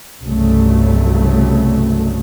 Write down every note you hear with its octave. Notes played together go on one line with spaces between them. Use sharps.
C2 G2 C#3 F#3 A3